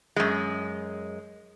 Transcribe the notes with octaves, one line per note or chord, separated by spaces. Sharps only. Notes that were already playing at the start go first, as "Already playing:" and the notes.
F#2 G#3